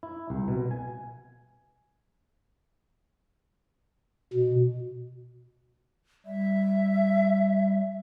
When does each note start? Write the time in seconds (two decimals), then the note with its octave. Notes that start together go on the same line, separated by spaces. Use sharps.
0.03 E4
0.30 C2
0.48 B2
0.71 G#5
4.33 B2
6.26 G3 E5